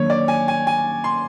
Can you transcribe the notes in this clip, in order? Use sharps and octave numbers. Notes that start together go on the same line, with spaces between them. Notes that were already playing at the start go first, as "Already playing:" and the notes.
Already playing: D#3 F#3 A#3 D4 C#5
D5
G#5
G#5
G#5
C6